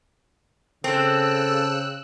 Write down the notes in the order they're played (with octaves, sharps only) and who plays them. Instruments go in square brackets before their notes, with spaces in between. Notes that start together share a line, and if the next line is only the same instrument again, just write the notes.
[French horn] C#3 [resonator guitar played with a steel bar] C4 [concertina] A4 [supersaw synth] E6 F#6